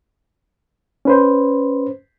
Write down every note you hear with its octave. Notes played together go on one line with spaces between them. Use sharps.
C#4 B4 C5